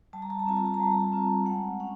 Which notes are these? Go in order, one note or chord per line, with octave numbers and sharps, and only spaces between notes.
G3 A5
A#5
A5
A#5
C4 F4 A5
A#5
A5
A#5
G3 A5
A#5
A5
C4 F4
G#3 F#5
C#4 F#5